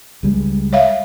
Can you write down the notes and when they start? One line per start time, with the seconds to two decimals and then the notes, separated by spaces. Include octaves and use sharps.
0.23 C#2 G3 G#3
0.73 C#5 E5 F5